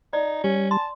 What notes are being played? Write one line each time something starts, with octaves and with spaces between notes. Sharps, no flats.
D#4 D5
G3 C#4
A5 C6